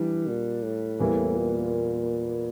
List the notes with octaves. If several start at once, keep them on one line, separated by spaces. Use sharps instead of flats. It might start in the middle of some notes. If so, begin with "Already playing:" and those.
Already playing: E3 G3 D4
A#2
A2
E2 E3 G3 A#3
A#2